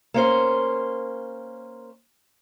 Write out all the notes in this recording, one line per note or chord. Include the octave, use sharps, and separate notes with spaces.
A#3 C#4 C5